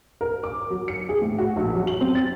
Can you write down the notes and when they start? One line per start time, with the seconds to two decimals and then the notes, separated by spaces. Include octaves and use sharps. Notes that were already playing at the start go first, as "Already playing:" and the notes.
0.21 A#4
0.44 D6
0.70 F#3
0.88 C#7
1.09 G#4
1.22 A2
1.38 F#4
1.57 A#1
1.75 F#3
1.87 F#7
2.01 C4
2.15 A6